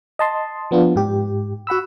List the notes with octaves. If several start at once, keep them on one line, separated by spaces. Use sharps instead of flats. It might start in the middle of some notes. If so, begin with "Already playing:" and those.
D#5 A5 C6
F3 B3 D4 F4
G#2 G4
F#4 F#5 B5 E6